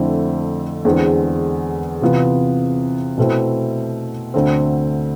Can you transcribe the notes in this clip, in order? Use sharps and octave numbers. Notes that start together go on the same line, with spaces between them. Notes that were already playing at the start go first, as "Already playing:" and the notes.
Already playing: F2 D3 A3 C4 E4
E2 D3 G#3 C4
C3 E3 B3 F4
B2 A3 C4 E4
D2 D3 A3 C4